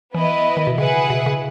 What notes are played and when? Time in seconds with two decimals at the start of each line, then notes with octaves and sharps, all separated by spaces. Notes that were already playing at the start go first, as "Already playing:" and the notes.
0.14 E3 B3 E4 B4 D#5
0.57 D#3
0.67 B2
0.78 C#3 E4 G#4 B4 F#5
1.10 B2
1.26 C#3